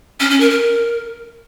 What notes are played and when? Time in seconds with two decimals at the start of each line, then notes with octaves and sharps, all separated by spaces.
0.20 C#4
0.30 C#4
0.40 A#4
0.50 A#4